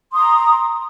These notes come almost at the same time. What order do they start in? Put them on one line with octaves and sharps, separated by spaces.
C6 D#6 A#5